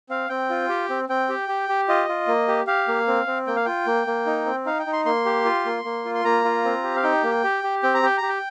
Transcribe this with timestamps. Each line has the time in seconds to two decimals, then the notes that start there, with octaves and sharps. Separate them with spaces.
0.09 C4 F5
0.29 C4 G5
0.50 F4
0.69 G4
0.89 C4
1.09 C4 G5
1.29 G4
1.49 G4
1.69 G4
1.89 F4 D#5
2.09 F4
2.27 A#3
2.48 G4
2.67 G4 F5
2.88 A#3
3.07 C4
3.27 C4
3.47 A#3 G5
3.56 F5
3.65 F4 G5
3.87 A#3
4.07 A#3
4.26 D#4
4.46 C4
4.66 D#4 F5
4.79 G5
4.86 D#4
4.93 C6
5.05 A#3 C6
5.26 G4
5.45 F4
5.65 A#3
5.84 A#3
6.05 F4
6.15 C6
6.25 A#3 A#5
6.45 F4
6.64 C4
6.83 G4
6.96 F5
7.03 D#4 G5
7.24 A#3
7.44 G4
7.63 G4
7.83 C4 G5
7.94 A#5
8.03 G4 G5
8.18 G4 A#5
8.29 G5